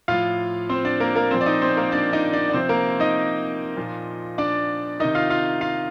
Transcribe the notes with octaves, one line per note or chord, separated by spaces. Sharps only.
A2 F3 F4 F5
C4 C5
D4 D5
A#3 A#4
A#3 A#4
A#2 F3 C4 C5
D5
D#4 D#5
C4 C5
A#3 A#4
D4 D5
D#4 D#5
D4 D5
D5
C3 F3 C4 C5
A#3 A#4
D#4 D#5
A#2 F3
D4 D5
C3 D#3 D#4 D#5
F4 F5
F4 F5
F4 F5